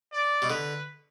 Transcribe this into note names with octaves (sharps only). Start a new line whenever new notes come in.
D5
B2
D3 B4